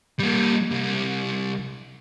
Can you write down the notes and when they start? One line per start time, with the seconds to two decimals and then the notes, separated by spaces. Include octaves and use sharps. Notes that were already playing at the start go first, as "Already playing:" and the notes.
0.19 G3 A#3
0.71 C2